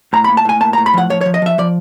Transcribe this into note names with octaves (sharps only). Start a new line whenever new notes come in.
A2 A#5
B5
A#3
A5
A2 G#5
A#3 A5
A#5
A2
B5
F3 F#5
F3 C#5
C#5
F3
D#5
F3 E5
F3 D5